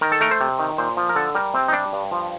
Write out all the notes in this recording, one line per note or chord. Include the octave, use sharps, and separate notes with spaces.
D#3 A#4
A4
A3 A#4
C5
C3
D#3
A#2 C5
F3
A#4
D3 A4
G3 A#4
C3 C4
D#4
G3 D4
G2
F3